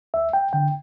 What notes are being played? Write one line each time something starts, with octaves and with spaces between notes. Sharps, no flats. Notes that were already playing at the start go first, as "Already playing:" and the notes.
D2 E5
G5
D3 G5